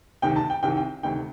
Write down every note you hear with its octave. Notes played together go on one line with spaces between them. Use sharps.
D2 C3 D#3 G5
A5
G5
C2 C3 D#3 G5
G5
D2 C3 D#3 G5